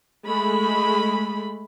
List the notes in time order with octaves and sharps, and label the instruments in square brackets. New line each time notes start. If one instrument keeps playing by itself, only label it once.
[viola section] G#3 A3 B5